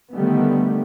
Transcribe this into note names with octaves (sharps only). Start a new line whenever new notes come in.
D3 D#3 G3 A3 B3